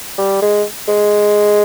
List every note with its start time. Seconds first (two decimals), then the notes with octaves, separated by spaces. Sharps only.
0.18 G3
0.42 G#3
0.88 G#3